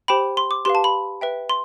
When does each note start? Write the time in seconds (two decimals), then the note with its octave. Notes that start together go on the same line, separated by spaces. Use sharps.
0.08 G4 C5 G5 B5
0.37 C6
0.51 D6
0.65 G4 B4 F5 C6
0.75 A5
0.84 B5
1.21 B4 E5 G5
1.50 C6